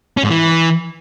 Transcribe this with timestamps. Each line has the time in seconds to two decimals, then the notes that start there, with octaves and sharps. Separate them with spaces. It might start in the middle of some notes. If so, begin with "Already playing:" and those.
0.17 C#4
0.23 G#2
0.30 E3